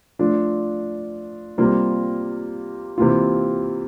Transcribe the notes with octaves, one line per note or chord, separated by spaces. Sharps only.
F3 A3 D4 F4
C3 G3 A#3 F4
C3 E3 A#3 F4